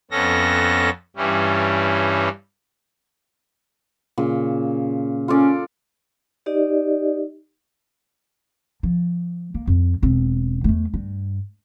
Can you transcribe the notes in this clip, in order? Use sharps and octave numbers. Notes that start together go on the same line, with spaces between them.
F2 B3 C#4 A4 A#6
G2 E3 G3 C#4
A#2 C#3
C#4 F4 A4 D5
D#4 G4 D5 D#5
F3
A#3
F2
E1 C4
E2 A3
G2